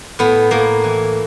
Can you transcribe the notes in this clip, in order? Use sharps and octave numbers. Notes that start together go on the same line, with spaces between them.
A2 B3
A2 A#3
E3